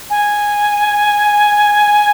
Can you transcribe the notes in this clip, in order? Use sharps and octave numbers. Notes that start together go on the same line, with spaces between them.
G#5